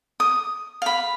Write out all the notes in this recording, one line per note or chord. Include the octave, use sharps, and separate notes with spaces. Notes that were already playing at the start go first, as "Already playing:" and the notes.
D#6
F5 B5